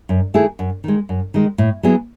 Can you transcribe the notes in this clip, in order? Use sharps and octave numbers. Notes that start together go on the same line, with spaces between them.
F#2
D#3 A3 E4 G#4
F#2
D#3 G#3
F#2
D#3 G#3
A2
F#3 B3 E4 G#4